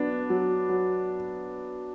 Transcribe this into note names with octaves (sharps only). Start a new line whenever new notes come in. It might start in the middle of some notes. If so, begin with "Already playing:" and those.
Already playing: F#3 B3 D4
F#3
F#3